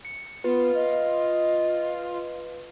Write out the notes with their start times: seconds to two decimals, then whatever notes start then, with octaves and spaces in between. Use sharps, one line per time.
0.05 C#7
0.44 B3 F4 B4
0.74 D#5